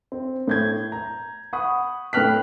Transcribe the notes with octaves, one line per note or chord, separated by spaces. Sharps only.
C4
A2 G6 G#6
A#5
F#5 B5 C#6 D#6
A2 B4 G5 F6 F#6 B6